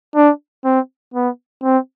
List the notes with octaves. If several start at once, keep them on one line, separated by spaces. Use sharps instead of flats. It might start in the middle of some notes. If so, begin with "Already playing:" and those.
D4
C4
B3
C4